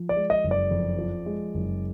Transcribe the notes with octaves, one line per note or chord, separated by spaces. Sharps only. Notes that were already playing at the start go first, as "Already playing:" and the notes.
Already playing: F3
D5
G#3
D#5
F#1
D5
F2
F3
G#3
F#1